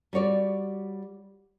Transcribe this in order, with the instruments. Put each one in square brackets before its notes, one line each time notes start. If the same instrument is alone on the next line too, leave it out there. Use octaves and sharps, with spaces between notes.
[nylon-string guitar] G3 F#4 C#5 D5